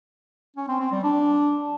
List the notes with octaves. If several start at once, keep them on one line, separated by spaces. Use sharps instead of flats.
C#4
C4
C4
G3
D4